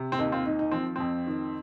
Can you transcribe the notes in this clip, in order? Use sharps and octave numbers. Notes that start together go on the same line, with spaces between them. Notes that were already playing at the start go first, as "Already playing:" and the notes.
Already playing: C3
C4
D#2 D#4
C4 F4
D#3 D#4
D#4
F3 C4
F2 C4
D#3